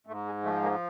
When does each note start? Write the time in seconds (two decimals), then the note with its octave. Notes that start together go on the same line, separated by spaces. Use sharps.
0.07 G#2 A3
0.25 G#3
0.43 F3 A3
0.62 G#3 A#3